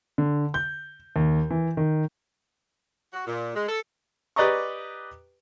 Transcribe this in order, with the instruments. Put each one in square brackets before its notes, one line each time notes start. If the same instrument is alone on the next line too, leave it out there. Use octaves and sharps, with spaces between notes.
[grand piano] D3
G6
D#2
E3
D#3
[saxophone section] F#4
A#2
G#3
A4
[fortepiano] G4 B4 D5 D#5 A#5 C#6